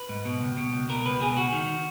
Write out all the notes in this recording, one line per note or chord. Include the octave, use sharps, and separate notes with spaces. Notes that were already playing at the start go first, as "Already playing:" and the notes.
Already playing: B4
G#2
B2
C#2
B2
C#2
B2 A#4
C#2 B4
B2 G#4
C#2 F#4
D#3